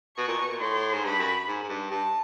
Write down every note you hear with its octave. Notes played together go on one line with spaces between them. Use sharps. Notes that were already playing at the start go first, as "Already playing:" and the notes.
B2 C#6
A#2
B2
A#2
A2 C6
G#2
G2 B5
F#2
G#2
G#2
G2
G2 A5